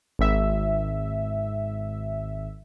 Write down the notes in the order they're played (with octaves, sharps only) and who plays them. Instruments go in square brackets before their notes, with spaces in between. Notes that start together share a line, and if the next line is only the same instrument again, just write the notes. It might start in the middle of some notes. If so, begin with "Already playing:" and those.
[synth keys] G#1 E5